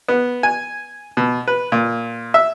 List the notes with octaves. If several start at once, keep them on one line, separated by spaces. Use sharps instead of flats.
B3
G#5
B2
B4
A#2
E5